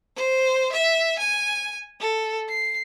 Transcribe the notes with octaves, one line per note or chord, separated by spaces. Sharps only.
C5
E5
G#5
A4
C7